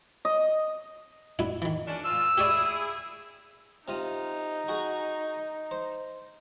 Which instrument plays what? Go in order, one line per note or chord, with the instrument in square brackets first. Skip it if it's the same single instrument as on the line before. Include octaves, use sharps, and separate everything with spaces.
[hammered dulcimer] D#5
[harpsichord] G2 B2 E4
D#3 E3
[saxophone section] G#3 C#4 D4
[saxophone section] A#2 F4 [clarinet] E6
[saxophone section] E4 G#4 [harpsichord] G4 C#5 D5
[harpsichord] C3 F4 D#5 [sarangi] D#4
[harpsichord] F#4 G#4
C5